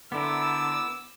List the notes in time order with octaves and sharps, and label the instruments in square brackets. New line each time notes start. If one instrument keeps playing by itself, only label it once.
[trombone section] D3 [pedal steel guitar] B3 E4 A#4 [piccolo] D6 [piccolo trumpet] E6